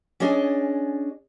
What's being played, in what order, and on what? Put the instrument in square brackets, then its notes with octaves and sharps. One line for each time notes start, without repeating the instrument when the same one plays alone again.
[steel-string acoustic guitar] C#4 D4 G#4 D#5 G#5